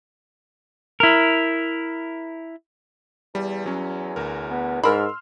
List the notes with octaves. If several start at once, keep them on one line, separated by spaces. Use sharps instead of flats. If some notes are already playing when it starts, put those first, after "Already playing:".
E4 A#4
E2 G3
F#3 C#4
D2 A#4
B3
G#2 A#4 B5 C6 E6 F6